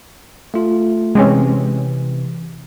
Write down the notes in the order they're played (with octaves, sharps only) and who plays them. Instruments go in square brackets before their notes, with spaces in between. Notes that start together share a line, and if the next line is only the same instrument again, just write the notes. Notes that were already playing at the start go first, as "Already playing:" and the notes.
[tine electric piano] A3 F4
[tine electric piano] C3 E3 [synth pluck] G#3 C4 C#4